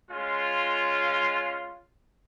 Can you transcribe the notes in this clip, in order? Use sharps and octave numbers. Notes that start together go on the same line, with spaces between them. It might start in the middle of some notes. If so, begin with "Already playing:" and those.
G#3 C#4 F4